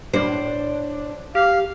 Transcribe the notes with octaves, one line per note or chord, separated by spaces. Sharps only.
A2 D4 C5 D5
G4 F5